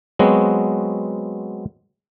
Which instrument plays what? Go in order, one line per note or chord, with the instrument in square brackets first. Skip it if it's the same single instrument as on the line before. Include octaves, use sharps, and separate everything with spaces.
[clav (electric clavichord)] F#3 G#3 B3 C4 F#4